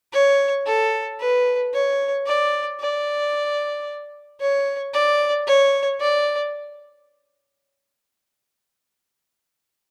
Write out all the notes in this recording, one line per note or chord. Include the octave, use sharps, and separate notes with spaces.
C#5
A4
B4
C#5
D5
D5
C#5
D5
C#5
D5